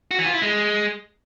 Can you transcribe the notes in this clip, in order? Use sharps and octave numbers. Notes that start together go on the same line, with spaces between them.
F#4
E3
F4
E4
G#3